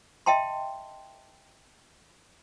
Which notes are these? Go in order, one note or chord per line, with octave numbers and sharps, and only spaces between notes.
D#5 E5 G5 A5 C6